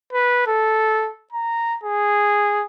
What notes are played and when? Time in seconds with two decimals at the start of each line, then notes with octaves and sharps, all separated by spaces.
0.13 B4
0.47 A4
1.32 A#5
1.84 G#4